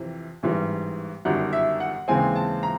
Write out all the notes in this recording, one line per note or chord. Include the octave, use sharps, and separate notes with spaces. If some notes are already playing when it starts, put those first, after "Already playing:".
Already playing: F2 C3 E3
A1 G#2 E3 G3 B3
G1 F#2 D#3 G3 F#5
E5
F#5
D#2 C#3 E3 G#3 C4 G#5
A5
A#5